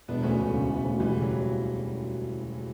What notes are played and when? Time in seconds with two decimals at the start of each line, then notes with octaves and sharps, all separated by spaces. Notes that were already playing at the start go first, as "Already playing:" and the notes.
0.08 E1 B3 D4
0.23 D2 A3 C#4
0.38 E1 E3
0.54 C#3
0.69 E1
0.84 D2
0.99 E1 E3 G3
1.15 C#3
1.22 F#3